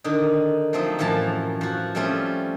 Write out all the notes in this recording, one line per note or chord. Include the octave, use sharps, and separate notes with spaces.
D3 D#3 D#4
F3 F#3 A3 C4 D#4
F#2 A2 E3 F3 A5 A#5
F3 F#4
F3 G3 A3 C4 C#4